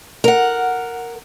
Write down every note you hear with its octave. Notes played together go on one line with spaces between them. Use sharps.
A#4 F#5